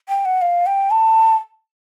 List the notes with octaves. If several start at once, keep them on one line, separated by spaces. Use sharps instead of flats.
G5
F#5
F5
G5
A5